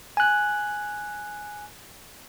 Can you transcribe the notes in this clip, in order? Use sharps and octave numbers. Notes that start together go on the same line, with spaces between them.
G#5 F#6